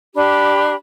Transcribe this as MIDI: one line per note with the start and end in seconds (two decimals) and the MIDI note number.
0.15 0.74 62
0.15 0.74 67
0.15 0.74 83